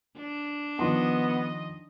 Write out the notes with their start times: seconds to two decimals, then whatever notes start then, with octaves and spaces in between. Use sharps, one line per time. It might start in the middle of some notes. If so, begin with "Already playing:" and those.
0.17 D4
0.79 D#3 F3 B3 D#5 C6